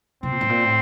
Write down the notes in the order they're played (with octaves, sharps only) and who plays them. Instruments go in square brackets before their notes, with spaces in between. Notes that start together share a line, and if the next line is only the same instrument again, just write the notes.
[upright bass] C3 [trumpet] C4
[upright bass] A#2
A2
A#2
A2